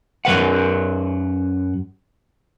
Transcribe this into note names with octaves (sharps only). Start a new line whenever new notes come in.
F#2 D#3 B4 F#5